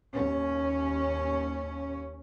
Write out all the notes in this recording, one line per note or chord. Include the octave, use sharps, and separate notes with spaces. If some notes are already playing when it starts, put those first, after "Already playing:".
D#2 C#4